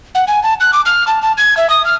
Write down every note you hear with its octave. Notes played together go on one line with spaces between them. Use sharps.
F#5
G#5
A5
F#6
D6
F6
A5
A5
G#6
E5
D#6
F6